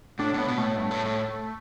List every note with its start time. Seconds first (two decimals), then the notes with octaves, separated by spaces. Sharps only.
0.19 A2 D4
0.34 A2 B3
0.48 B2
0.58 A2 A3
0.77 G2
0.91 A2
1.05 A2